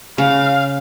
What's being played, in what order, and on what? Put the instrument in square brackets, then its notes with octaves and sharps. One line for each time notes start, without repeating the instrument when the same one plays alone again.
[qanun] C#3 [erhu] F5